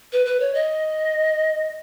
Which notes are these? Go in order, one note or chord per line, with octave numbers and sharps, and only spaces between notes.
B4
B4
C#5
D#5